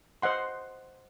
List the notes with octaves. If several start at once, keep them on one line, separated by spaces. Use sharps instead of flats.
C5 D#5 F#5 C6